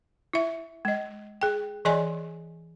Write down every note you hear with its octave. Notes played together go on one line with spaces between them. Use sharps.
E4 E5
G#3 D#5
G#4 G5
E3 G#4 D5 D#5 G#5 C6